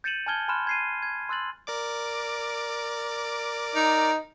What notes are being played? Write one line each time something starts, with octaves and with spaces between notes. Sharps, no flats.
G6 A6 C#7 D#7 E7 F#7
G#5 A5 F6 G#6 G7
G#5 B5 C6 F6 F#6 E7
G#6 C7 D#7
G#6
C6 E6 F#6 A6 F#7
A#4 D5 D6
D#4